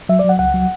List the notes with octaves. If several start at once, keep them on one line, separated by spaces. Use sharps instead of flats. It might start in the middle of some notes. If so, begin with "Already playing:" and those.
F#3 E5
D5
F#3 F#5
C#2 F#5
F#3